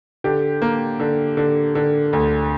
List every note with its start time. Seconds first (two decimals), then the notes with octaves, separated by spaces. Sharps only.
0.24 D3 G4
0.62 A#3
1.00 D3
1.37 D3
1.75 D3
2.13 D2